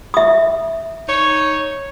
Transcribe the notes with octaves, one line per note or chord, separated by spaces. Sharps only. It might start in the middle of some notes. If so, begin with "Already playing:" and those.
E5 D#6
D#4 C#5